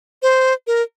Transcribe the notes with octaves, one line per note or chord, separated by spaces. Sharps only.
C5
A#4